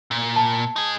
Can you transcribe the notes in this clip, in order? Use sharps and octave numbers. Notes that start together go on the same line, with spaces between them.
A#2
A5
D#4 G#4